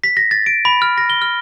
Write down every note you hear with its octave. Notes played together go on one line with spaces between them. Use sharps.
B6
A#6
A6
D7
B5
F6
A#6
G7
F6